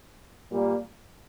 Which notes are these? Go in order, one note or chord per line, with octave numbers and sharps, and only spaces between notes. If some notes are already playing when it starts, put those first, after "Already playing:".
A#2 G3 A#3